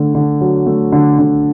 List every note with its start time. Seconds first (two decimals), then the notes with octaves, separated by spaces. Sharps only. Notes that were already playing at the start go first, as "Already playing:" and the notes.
Already playing: D3 A3
0.15 D3
0.41 F#3
0.67 A3
0.92 D3
1.19 D3